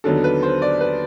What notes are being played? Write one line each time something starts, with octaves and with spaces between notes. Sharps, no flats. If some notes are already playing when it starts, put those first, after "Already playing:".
D#2 D3 F#3 B3 D#4 A4
B4
C5
D5
B4